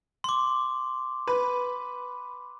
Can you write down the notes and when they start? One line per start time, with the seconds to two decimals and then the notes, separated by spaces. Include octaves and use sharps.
0.24 C6 D6
1.27 B4